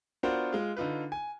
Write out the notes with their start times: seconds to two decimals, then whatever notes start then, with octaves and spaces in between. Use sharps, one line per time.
0.23 B3 D4 F4 F#4 A#4 C5
0.52 G#3 F4
0.77 D3 D#4 F4 B4
1.12 G#5